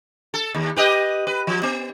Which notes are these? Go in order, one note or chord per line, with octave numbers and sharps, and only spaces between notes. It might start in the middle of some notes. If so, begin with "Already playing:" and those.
A4
D#2
G4 B4 D#5
B4
F3
B3